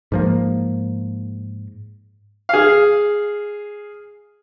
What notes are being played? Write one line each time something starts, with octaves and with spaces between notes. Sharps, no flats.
G#2 F3 A#3
G#4 F5